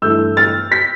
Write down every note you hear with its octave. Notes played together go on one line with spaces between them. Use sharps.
G2 E3 A3 E4 E6 G6
F6 A6
G6 B6